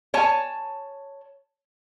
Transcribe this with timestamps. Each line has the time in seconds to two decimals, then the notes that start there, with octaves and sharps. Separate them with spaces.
0.14 C#5 G#5 A5